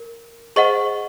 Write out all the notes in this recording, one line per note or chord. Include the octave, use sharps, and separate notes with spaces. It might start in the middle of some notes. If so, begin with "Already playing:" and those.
Already playing: A#4
G#4 C5 D#5 F#5 C#6